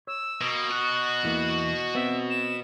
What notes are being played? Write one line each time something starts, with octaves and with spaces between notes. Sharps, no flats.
C#5 E6
B2 A#3
F#4 F#6
E2 E3 A#3
B3 C4 E5
E7